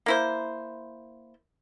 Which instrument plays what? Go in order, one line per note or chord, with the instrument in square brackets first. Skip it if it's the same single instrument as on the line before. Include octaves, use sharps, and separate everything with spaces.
[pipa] A#3 E4 C5